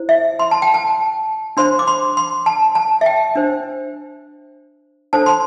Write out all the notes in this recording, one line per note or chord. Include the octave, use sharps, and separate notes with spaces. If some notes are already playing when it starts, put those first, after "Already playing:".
Already playing: E4 C5
E5
C6
A5
G5
A5
D4 C5 C6
D6
C6
C6
A5
A5
E5
G5
D4 C5
D4 A4 C5 A5
C6